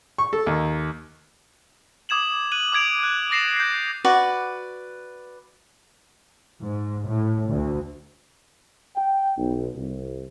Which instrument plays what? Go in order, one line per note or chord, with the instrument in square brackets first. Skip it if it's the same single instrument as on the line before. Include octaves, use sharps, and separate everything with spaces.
[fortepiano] C#6
A4
D#2
[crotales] D6 D#6 G#6 E7 F#7
F#6 D#7 F#7
D6 D#6 G#6 D7 F7
F#6
D6 A6 A#6 C7 E7 F7
G6 C7
[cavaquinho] F#4 B4 D5
[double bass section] G#2
A2
D2
[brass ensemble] G5
B1
C2